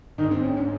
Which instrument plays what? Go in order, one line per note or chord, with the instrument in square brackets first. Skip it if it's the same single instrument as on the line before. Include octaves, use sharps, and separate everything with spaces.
[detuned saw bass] G#2 [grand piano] D#3 D#4
[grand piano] C4
C#4
C#4